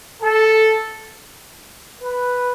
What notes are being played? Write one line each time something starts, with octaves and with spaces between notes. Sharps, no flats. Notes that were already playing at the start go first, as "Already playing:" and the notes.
A4
B4